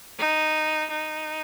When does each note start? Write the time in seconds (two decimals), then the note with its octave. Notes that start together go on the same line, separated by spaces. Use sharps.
0.19 D#4
0.90 D#4